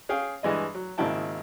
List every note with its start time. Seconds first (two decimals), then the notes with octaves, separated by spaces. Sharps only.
0.09 C#4 G#4 F5 G5
0.43 G2 E3 G#3 D#5
0.75 F#3
0.98 G#1 C#3 A#3 E4 G5 A5